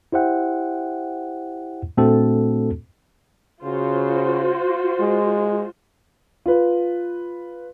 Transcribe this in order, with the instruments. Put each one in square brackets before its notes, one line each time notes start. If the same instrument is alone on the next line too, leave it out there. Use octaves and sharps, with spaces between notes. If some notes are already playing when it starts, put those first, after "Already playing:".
[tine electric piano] E4 G4 C5 E5 F#5 G5
A#2 A3 C4 D4 F#4 A4
[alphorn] C#3 [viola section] F4 F#4 C5
[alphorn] G#3
[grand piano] F4 B4